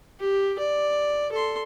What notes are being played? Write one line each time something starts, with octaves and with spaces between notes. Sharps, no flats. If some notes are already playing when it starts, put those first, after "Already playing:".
G4
D5
A4 C6